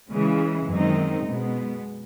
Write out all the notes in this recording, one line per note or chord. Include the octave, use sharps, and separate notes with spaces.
C#3 E3 G#3
F#2 D#3 G#3 C4 D#4
B2 G#3 B3